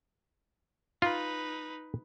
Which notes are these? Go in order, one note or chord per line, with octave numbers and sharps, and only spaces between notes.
D#4 F4 B4